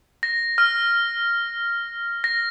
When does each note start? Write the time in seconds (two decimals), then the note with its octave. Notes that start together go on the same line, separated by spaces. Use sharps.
0.23 A#6
0.58 F6
2.24 A#6